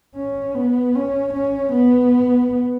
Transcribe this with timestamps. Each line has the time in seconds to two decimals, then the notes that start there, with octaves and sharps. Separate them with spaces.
0.16 C#4
0.55 B3
0.95 C#4
1.34 C#4
1.73 B3